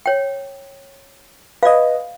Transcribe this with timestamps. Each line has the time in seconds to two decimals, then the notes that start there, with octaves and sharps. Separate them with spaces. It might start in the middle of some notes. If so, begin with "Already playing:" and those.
0.06 C#5 G5
1.63 B4 D5 D#5 F5